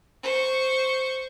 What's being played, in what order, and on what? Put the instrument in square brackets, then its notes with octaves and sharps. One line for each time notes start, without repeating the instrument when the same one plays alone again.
[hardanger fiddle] C5 C#6